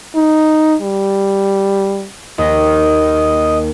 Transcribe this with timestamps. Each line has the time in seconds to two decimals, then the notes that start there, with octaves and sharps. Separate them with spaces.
0.16 D#4
0.82 G3
2.38 D#2 D#5